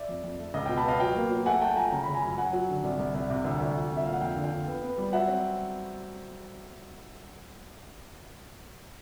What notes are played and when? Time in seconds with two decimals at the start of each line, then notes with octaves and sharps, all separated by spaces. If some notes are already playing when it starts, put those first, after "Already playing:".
Already playing: D5 E5
0.09 F2
0.24 F2
0.39 A3
0.54 C#2 D#5 F5
0.66 B2 F5 G5
0.77 A5 B5
0.85 B3 D#5 F5
1.00 F#3 F5 G5
1.16 A#3
1.31 F#3
1.46 A3 F#5 G#5
1.62 A3 G5 A5
1.76 F3 G#5 A#5
1.92 C#3 A#5
2.03 C#3 B5
2.14 G#5 A#5
2.23 F#2
2.37 F#2 F#5 G#5
2.53 F#3
2.69 D3
2.83 C2
2.99 C2
3.14 C2
3.30 C3
3.44 D2
3.60 D2
3.75 F3
3.91 C2
3.97 E5
4.05 A#2 F5
4.13 F#5
4.21 F2 F5 G5
4.36 D3
4.44 F5 G5
4.52 D3
4.67 B3
4.83 B3
4.98 G3
5.13 F#3 E5 F#5
5.28 C4